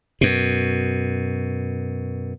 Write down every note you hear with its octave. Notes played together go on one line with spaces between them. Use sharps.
F#2 B2